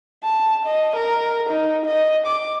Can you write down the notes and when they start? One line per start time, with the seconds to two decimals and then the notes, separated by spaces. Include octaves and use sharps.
0.24 A5
0.66 D#5
0.96 A#4
1.50 D#4
1.86 D#5
2.27 D6